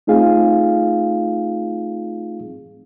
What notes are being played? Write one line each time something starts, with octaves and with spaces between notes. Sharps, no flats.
A3 C4 D#4 F4 G#4 F5